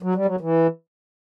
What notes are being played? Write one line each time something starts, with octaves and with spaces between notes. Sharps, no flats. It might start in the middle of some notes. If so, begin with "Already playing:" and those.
F#3
G3
F#3
E3